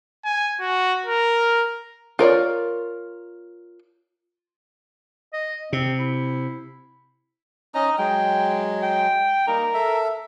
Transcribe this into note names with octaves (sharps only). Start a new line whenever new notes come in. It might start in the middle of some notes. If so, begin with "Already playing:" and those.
G#5
F#4
A#4
F4 A#4 C#5 D5
D#5
C3 C4
E4
C#4 D#4 D#5
F#3 G#3 G5
G5
G3 A#3 D#4 A#4
A4 E5